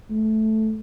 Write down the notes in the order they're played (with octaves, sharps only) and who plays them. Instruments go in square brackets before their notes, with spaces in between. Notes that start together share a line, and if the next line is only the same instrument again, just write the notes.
[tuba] A3